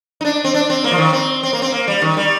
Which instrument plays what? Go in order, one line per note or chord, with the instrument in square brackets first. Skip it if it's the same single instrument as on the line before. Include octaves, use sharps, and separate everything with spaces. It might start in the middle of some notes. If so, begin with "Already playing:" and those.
[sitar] D#4
D4
C4
D4
C4
A#3
F3
D#3
C4
C4
A#3
C4
A#3
G3
D#3
G3